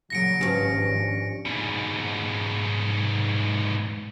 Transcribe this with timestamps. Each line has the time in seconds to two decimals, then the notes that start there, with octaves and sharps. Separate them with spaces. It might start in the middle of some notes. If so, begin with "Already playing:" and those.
0.10 A#2 C#3 F#3 A#6 C#7 D7
0.41 G#1 G2 F3 C#4
1.46 G#2 B2